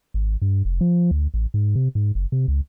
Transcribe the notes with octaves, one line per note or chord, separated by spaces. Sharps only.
G#1
G2
F1
F3
D2
A1
G#2
C3
G#2
F#1
C3
C#2